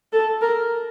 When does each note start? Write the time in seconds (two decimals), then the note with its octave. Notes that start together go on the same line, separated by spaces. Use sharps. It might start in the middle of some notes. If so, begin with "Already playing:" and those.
0.12 A4
0.42 A#4